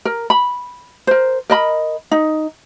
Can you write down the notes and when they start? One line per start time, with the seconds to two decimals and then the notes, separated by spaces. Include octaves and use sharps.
0.05 A#4
0.30 B5
1.07 A#4 C5
1.50 A#4 D#5 B5
2.11 D#4